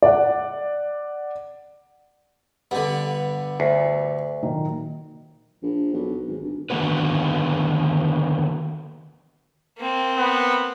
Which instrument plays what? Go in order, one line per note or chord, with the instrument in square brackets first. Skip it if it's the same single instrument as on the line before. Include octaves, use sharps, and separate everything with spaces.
[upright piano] D5 F#5
[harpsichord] G2 D3 [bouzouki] B3
[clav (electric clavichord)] D2
[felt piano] A#2 D#3 F#3
[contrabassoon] A#1
B1
G#1
G1
[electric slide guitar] D3 D#3 A#3 B3 F#4 B4
[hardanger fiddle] A#3 C4
[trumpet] B3